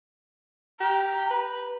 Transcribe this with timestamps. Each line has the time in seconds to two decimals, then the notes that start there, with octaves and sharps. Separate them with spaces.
0.80 G4 A#5
1.30 B4